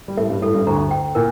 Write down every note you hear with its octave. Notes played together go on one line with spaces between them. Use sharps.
G3
A2 A3 E5
G2 G3
A2 A3 A4
G2 G3
D2 D3 A#5
G5
A#2 A#4